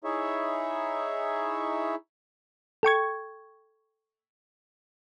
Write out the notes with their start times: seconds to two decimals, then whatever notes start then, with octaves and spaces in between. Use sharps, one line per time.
0.04 D#4 E4 G#4 C#5 E5
2.83 A4 G5 C#6 G#6